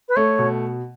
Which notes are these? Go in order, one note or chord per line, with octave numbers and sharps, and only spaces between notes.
B4
A3 C#5
B2